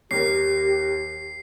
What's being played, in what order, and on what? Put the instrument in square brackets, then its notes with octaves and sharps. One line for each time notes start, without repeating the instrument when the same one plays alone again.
[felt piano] D#2 A#4 [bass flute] G4 [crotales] C7